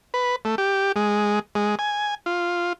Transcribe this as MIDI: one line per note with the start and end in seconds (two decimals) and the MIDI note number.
0.14 0.36 71
0.45 0.55 57
0.58 0.92 67
0.96 1.39 56
1.55 1.75 56
1.79 2.15 80
2.26 2.73 65